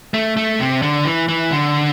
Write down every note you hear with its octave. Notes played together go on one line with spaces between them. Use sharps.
A3
A3
C3
D3
E3
E3
D3